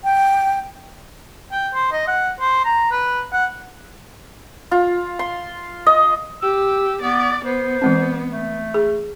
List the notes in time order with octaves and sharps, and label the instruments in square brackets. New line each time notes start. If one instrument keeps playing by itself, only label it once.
[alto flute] G5
[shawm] G5
C5
D#5
F#5
C5
A#5
B4
F#5
[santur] F4
C6
D#5
[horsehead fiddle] G4 [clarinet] E6
[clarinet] B3 [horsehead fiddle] D5
[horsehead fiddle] B3 [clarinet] C5
[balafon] E3 G#3 C4
[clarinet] A3
[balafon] G#4